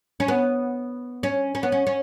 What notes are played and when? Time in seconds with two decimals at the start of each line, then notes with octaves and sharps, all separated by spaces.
0.20 C#4
0.28 B3
1.23 C#4
1.55 C#4
1.63 B3
1.72 C#4
1.87 C#4